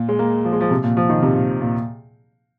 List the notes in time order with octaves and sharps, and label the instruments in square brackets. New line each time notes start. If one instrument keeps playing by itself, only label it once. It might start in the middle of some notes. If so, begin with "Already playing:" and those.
Already playing: [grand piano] A#2
G#3
A#3
F3
G#3
F3
C3
A#2
F3
D#3
C3
A#2
A#2